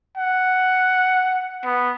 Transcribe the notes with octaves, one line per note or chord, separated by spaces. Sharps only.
F#5
B3